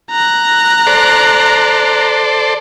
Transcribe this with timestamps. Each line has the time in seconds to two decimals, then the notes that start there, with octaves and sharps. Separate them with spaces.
0.11 A#5 F#6
0.87 A4 C5 D5